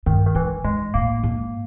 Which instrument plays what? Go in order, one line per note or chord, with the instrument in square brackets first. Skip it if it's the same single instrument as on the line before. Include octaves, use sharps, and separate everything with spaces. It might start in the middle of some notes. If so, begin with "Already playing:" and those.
[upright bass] G2 [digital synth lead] D#3
[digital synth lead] D#3
[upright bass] G#2 [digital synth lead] E3
[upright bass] G#2 [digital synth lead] G#3
[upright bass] A2 [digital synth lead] A#3
[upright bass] G#2